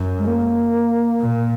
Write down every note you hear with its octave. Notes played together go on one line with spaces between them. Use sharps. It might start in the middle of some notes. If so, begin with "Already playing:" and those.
Already playing: F#2
G#3
A#3
A#2